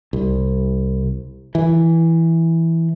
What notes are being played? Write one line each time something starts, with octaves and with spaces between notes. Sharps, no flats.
C2
E3